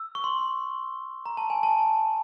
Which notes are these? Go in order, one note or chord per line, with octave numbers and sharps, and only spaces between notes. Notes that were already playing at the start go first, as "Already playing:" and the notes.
Already playing: E6
C#6
C6
A#5
A5
G#5
A5